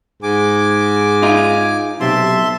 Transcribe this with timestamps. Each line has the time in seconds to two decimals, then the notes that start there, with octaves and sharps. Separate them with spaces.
0.23 G#2 G#5 D6
1.23 D#4 F4
2.01 B1 C3 E5 A5 C6